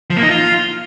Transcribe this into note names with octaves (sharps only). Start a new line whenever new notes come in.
F3
A#3
D#4
F4